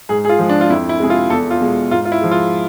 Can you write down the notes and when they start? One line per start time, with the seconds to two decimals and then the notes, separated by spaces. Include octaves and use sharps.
0.09 G#2 G#4
0.25 G#4
0.29 F4
0.39 F3 G#3
0.49 D4
0.61 F4
0.70 F2 E4
0.89 E4
1.00 C3 G#3 G#4
1.10 F4
1.30 E2 A4
1.51 F4
1.61 B2 G#3
1.91 G#2 F4
2.05 F4
2.12 E4
2.22 F3 G#3
2.31 F4